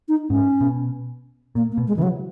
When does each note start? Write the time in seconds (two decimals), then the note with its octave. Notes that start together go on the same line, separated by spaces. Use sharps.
0.09 D#4
0.29 G#2 C#4
0.61 B2
1.55 A#2 A#3
1.72 A#3
1.78 B2
1.87 G#3
1.96 C#3 E3
2.03 F#3